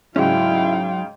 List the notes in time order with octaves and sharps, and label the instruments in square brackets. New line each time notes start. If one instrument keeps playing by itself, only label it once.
[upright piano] G#2 C#3 [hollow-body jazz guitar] F#3 C#4 [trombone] E4 [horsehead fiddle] F5 G5